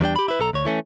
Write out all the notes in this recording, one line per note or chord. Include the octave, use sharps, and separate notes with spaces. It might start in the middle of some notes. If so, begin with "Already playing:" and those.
E2 G3 D4 G5
G4 B5
E4 B4
B1 A4 A#5
D2 C#5
E3 A3 C#4